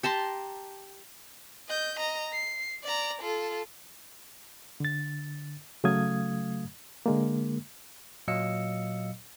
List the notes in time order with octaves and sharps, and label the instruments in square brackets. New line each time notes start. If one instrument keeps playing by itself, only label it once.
[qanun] G4 A5 A#5 C6
[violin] D#5 G6
D#5 A#5
C7
D5 A#5
F4 A4
[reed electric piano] D3 A6
C#3 F#3 A3 F5 D#6 G#6
D3 G#3 A#3
[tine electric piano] A#2 F#3 D#5 F5 E6 C#7